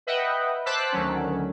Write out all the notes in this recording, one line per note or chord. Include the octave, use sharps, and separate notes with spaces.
B4 D#5 E5 F#5 G5
C5 A5 D6 E6 F#6 B6
D2 D#3 F#3 C#4